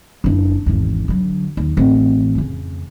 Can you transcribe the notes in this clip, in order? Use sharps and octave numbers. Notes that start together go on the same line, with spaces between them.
F#1 D4
G#1 E2
D3 F#3
D#2
A1 C4
F2 C#3